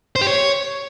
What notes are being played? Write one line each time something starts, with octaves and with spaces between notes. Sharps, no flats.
C5
G4
C#5